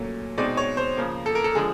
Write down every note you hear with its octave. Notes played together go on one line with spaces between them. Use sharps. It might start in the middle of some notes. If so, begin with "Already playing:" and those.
Already playing: A#2 F#3 A3 C#4
B2 G#3 C4 D#4 D5
C#5
C5
C#3 F3 A#3
A4
A#4
A4
D3 F3 G#3 G#4